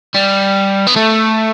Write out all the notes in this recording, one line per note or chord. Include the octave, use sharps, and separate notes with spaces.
G3
B3
A3